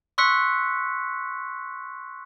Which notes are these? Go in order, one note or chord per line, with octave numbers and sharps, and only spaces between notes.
C6 C#6 E6 F#6 B6 C#7